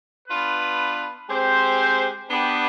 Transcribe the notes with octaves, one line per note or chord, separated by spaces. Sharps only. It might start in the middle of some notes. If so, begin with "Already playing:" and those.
B3 D4 F4 B4
G#3 C4 G4 C5
B3 D4 G4